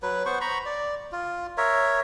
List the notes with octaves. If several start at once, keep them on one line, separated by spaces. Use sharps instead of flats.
F#3 B4
B3 C5 C#6
A#5 B5 C#6
D5
F4
A#4 C#5 E5